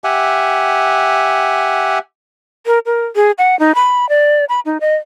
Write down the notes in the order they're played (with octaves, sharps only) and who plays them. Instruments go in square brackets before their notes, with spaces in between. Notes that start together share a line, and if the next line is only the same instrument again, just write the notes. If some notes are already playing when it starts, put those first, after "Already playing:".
[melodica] G4 E5 F#5 G#5
[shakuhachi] A#4
A#4
G#4
F#5
D#4
B5
D5
B5
D#4
D#5